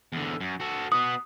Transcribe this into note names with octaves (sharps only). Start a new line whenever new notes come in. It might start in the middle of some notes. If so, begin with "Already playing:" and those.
E2 D3
F#2
F#4 A4
B3 F#4 D#6